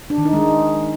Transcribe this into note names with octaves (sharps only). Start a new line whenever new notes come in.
D4
D#3
D#4
G#3